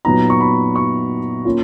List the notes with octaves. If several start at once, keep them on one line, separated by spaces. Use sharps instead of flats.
A#2 F#3 B3 D#4 A#5
C#6
B5
C#6
A#3 C#4 F4